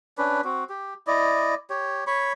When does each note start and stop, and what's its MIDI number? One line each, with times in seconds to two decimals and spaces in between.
0.18 0.41 61
0.18 0.41 62
0.18 0.41 71
0.44 0.64 60
0.44 0.64 66
0.69 0.94 67
1.07 1.55 64
1.07 1.55 74
1.07 1.55 75
1.70 2.04 67
1.70 2.04 73
2.07 2.33 73
2.07 2.33 83
2.07 2.33 85